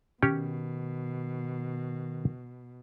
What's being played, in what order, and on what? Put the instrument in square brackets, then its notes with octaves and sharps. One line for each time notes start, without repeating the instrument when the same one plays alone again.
[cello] B2 [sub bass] D#3 [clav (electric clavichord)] C#4 G4 C#5